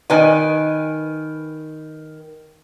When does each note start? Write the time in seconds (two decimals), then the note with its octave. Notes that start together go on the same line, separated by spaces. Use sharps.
0.10 D#3 B4 G#5